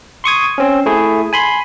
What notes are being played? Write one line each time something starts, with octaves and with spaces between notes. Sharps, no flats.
C6 C#6 D#6 G#6
C4 C#4
A3 E4 G#4
G#5 B5 C6